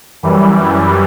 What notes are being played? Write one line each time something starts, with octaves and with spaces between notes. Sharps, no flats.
F#2 E3 G3